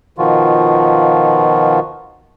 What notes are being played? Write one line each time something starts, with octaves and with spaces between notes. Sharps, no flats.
B2 D#3 F3 F4 F#4